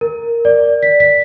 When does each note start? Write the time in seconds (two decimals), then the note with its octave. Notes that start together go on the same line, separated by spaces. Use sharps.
0.01 A#4
0.45 D5
0.83 B6
1.00 B6